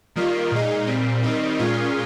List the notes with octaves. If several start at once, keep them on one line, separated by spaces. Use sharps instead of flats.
D#3 G3 A#3 F4
A#2 G#3 D#4
A#2 G3 C4
D#3 G3 C4 D#4
A#2 G#3 C#4 F4